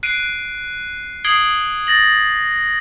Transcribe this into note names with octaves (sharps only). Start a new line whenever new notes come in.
F#6 C7 D7 D#7
D#6 G#6 C7 D7 F#7 G7
A6 A#6 F#7